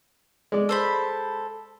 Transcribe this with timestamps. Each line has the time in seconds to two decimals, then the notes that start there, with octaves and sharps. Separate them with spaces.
0.52 G#3 D5
0.69 A4 C5 B5